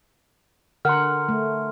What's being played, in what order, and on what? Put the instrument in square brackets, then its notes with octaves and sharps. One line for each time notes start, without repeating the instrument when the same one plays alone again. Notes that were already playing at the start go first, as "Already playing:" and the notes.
[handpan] D3 A#4 F#5 [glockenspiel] C6 F6
[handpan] A3